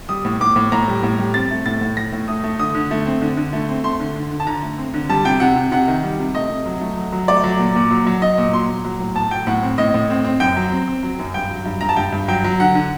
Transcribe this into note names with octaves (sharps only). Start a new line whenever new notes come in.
G3 D#6
A2
A2 D6
A2
A2 A#5
G3
A2
G3
C4 A6
A3
A2 A6
A2
A2 A#6
A2
A3 D#6
A3
D3 D#6
D3
A3
C4
D3
D3
A3
C4
A3 C6
D3
D3
D3
A5
D3 A#5
A3
C4
D3
G3 A5
C3 G5
C3 F#5
C3
C3 F#5
D#3
G3
C3
A3 D#5
C3
F#3
A3
F#3
F#3
A3 D5
F#3
A#2
A#2
F#3
F#3
F#3 D#5
A#2
F#3 C6
A#2
F#3
A2
A2 A5
F#3 G5
A2 F#5
C4
A2 D#5
A2
C4
C4
F#2 G5
F#3
C4
C4
F#3
F#2
G2 G5
F#3
G2
G2 A#5
A5
G2 G5
G2
F#3 G5
F#3
D3 F#5
D3